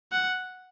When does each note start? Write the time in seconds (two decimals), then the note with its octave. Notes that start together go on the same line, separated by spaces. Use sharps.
0.12 F#5